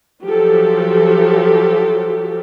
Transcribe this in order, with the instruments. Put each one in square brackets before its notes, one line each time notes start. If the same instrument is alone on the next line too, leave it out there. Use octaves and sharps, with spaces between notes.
[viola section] F3 F#3 G4 A4